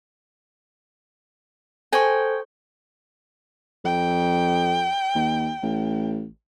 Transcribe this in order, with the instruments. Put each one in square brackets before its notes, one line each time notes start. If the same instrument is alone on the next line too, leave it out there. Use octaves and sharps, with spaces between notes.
[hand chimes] A4 C5 C#6 [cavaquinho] G5 G#5
[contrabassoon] F2 [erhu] G5
[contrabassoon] D#2
A1